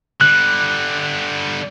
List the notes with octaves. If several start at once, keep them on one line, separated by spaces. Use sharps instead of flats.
D3 G3 F#6